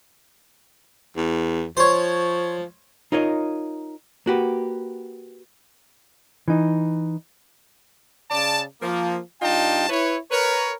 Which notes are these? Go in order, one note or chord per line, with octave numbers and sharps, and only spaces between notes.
E2
F3 C5 C#5
D#4 F4 A#4 C#5 D#5
A#3 F#4 G4 B4
E3 D#4
C#3 D5 A5
F3 A#3
G2 D4 D#4 F4 G5 A5
E4 B4 C#5
A#4 B4 C#5